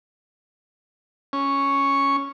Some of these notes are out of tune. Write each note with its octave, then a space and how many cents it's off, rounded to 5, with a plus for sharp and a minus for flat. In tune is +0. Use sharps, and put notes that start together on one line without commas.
C#4 +0 C#6 +0